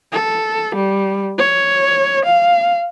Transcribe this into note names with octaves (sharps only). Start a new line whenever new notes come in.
A4
G3
C#5
F5